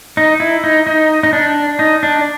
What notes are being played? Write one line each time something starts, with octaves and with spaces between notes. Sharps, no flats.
D#4
E4
D#4
D#4
D#4
D4
D#4
D4